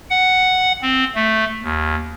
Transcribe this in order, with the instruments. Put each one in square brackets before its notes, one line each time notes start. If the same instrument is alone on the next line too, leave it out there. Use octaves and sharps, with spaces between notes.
[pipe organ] F#5
C4
A3
D#2